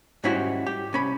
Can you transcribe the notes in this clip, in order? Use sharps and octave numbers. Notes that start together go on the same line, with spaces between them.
G#2 G3 C#4 E4 F#4
G4
C2 C#4 B5